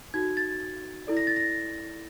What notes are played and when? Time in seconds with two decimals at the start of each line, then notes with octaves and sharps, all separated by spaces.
0.14 D#4 F#4 A4 G#6
0.37 A6
1.07 E4 A4 D5
1.17 A#6
1.27 A6
1.36 A#6